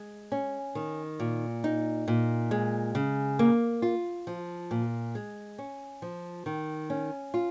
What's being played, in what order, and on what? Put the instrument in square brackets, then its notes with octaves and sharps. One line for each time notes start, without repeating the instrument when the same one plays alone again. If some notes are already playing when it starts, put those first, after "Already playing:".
Already playing: [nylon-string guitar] G#3
C#4
D#3
A#2
D#4
A#2
G#3
C#3
A#3
F4
F3
A#2
G#3
C#4
F3
D#3
C#4
F4